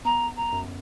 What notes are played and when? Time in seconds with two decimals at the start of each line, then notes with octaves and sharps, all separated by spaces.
0.05 B3 A#5
0.37 A#5
0.52 F#2